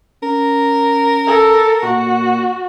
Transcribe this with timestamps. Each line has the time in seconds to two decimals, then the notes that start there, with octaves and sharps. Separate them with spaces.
0.23 C#4 A#4
1.27 A4
1.83 A#2 F#4